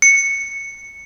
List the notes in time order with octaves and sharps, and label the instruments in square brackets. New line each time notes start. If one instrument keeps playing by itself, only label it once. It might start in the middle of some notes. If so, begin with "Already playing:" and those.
[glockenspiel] C#7